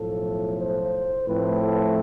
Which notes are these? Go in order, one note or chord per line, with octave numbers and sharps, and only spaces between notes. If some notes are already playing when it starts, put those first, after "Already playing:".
Already playing: B1 A2 F3 A4
C5
A2 F3 A3 C4 B4
A4